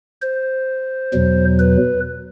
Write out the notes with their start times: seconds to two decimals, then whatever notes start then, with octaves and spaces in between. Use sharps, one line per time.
0.22 C5
1.13 E2 B2 F#3
1.59 B4